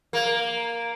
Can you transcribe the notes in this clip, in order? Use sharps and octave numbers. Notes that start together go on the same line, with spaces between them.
A#3